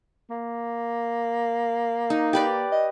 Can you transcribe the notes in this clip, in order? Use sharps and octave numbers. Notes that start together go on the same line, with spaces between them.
A#3
D#4
G4 B4 D5
D#5